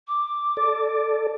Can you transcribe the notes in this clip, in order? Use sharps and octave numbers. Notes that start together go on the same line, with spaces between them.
D6
A4 D5